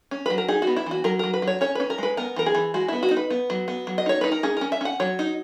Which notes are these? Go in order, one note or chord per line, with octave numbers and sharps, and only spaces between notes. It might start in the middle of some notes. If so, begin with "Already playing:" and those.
C#4
F#3 B4
A#4
D#4 G#4
B3 F#4
E4
E3 F#4
F#3 A#4
F#3 A#4
B4
F#3
C#5
C#4 C#5
C#4 B4
A#4
G#3 B4
B3 A#4
E3 A#4
G#4
E3
G#3 F#4
B3 E4
F#4
D#4
B4
B3
F#3
B3
F#3
D#5
D#4 C#5
D#4 B4
A#4
C#4 G#4
C#4 A#4
E5
C#4 F#5
F#3 C#5
D#4